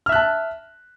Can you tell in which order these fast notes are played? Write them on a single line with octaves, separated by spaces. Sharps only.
F6 E5 F#6 A5